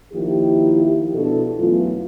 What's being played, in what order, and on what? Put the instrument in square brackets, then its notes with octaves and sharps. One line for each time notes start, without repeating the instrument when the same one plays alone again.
[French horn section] D#3 F3 A#3 E4 G4
B2 D4 E4 A4
F#2 E3 A3 B3 F4